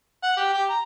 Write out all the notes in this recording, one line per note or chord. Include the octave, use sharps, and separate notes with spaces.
F#5
G4
G4
A#5